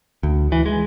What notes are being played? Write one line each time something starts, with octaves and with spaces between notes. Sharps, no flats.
D2
E3
G#3